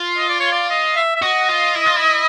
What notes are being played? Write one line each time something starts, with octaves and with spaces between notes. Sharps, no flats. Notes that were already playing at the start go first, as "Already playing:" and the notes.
Already playing: F4
D#5
D5
C#5
D5
D#5
E5
E5
F#4 D#5
F4
E4
F4
E4